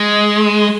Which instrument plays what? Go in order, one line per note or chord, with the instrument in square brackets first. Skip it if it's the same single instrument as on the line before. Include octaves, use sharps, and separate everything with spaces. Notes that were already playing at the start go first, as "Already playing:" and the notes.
Already playing: [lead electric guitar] G#3